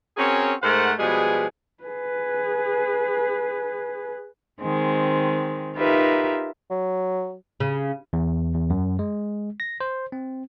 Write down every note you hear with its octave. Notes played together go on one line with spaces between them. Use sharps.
C4 C#4 F#4 G#4 A#4 C#5
G#2 A3 A#4 C5 F#5
B2 F3 G3 G#3 G#4 B4
G#4 B4
D#3 G#3 C4
D#4 F4 G4 A#4 B4 E5
F#3
C#3
E2
E2
F#2
G#3
A#6
C5
C4